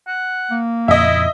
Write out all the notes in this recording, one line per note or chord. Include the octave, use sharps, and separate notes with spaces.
F#5
A#3
F2 A#2 C#3 E4 D#5 E5